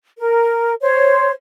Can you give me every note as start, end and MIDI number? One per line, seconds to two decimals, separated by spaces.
0.18 0.74 70
0.81 1.31 72
0.81 1.31 73